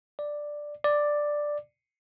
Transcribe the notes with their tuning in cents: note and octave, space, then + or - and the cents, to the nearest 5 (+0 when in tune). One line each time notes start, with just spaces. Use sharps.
D5 +5
D5 +5